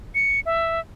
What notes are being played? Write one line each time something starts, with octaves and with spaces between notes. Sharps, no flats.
C#7
E5